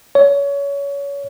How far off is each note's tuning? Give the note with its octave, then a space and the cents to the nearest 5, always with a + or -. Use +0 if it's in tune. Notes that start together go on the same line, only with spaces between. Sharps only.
C#5 +25